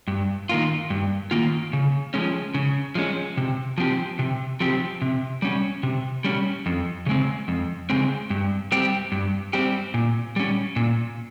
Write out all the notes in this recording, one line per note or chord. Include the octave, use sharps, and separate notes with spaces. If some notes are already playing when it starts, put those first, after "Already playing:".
G2
D#3 A#3 F4
G2
D#3 A#3 F4
C#3
F3 G#3 C#4
C#3
F3 G#3 C#4
C3
F3 C4 G4
C3
F3 C4 G4
C3
G3 C#4
C3
G3 C#4
F2
C#3 G#3 C4
F2
C#3 G#3 C4
G2
G3 C4 G4
G2
G3 C4 G4
A#2
G3 C#4
A#2